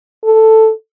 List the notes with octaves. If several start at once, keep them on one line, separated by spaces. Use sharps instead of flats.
A4